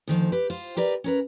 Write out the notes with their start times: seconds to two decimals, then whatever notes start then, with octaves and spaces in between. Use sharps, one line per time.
0.08 D2 D#3 F3
0.32 G4 B4
0.50 F4 C5
0.77 G4 A#4 B4 D5
1.04 C#4 A#4 B4